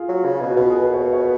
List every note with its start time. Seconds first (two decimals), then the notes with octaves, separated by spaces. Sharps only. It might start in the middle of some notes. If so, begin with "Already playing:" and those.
Already playing: F4 G#4
0.09 F#3
0.25 C#3
0.41 B2
0.48 F#4
0.57 B2 F4
0.69 G#4
0.75 A#4
0.81 B4
0.94 C#5
1.06 B4
1.13 C#5
1.22 B4